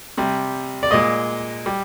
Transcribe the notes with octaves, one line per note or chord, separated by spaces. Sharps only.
C3 G3
D5
A#2 G#3 D#5
G3